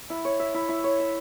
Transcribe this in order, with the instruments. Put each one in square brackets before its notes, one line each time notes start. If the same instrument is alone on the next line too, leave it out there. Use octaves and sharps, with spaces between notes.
[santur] E4
C#5
E5
E4
E4
C#5
E5